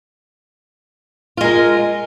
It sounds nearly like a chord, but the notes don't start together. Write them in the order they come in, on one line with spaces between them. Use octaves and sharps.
F4 G#3 A#4